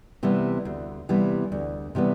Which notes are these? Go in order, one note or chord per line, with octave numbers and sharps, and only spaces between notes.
C3 E3 G3 B3
D2
C3 E3 G3 B3
D2
C3 E3 G3 B3